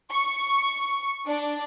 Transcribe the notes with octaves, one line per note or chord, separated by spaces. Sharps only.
C#6
D4